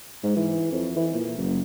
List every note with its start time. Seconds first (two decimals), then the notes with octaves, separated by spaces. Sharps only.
0.24 G#2
0.36 E3
0.72 F2
0.96 E3
1.14 A#2
1.38 F#1